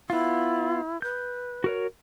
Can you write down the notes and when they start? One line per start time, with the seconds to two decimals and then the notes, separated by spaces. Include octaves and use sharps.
0.10 B3 E4 F4
1.02 B4 G6
1.64 F#4 A#4 C#5